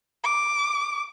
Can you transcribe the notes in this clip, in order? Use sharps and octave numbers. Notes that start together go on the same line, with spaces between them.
D6